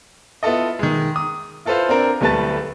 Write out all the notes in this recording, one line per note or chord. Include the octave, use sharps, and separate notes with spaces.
B3 E4 F4 A4 D#5
D#3 G#3
D#6
E4 F4 A4 B4 C5 F5
C4 D4 A#4
D1 G3 A3 B4 A5 A6